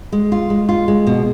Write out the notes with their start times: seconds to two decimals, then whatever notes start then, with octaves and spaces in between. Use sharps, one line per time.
0.12 G#3
0.32 F4
0.50 G#3
0.69 F4
0.88 G#3
1.07 B2